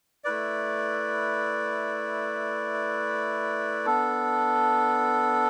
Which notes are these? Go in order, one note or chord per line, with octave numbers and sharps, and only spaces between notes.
A3 E4 B4 D5
B3 D4 A4